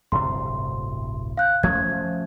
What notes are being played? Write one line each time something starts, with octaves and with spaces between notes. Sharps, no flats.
D1 G1 C3 C6
F5 F#6 G6
F3 A3 C#4 G#6